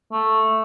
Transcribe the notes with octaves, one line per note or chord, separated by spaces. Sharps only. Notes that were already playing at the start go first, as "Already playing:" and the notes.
A3